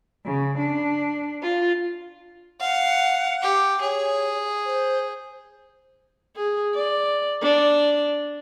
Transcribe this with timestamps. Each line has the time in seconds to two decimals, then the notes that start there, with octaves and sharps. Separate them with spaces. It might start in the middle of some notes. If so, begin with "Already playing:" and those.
0.25 C#3
0.59 D4
1.42 F4
2.60 F5 F#5
3.42 G4
3.81 G#4 C#5
4.65 C5
6.36 G#4
6.74 D5
7.42 D4